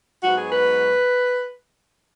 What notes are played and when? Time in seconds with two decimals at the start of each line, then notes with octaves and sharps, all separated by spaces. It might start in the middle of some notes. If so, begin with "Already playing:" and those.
0.23 G#2 F#3 B3 F#4
0.37 G#4
0.52 B4